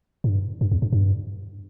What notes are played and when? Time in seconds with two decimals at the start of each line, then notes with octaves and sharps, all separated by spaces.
0.24 G#2
0.30 G2
0.61 G2
0.72 E2
0.82 G2
0.93 G2